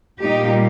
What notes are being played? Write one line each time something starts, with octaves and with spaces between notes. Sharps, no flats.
A#2 G3 A#3 D#4 G4